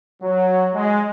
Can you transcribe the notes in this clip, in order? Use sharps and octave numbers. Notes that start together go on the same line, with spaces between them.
F#3
G#3